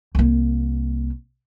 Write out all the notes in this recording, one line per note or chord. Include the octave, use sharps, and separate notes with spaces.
C2 A#3